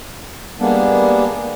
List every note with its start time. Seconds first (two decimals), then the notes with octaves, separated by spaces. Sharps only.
0.59 G3 G#3 A#3 B3 D4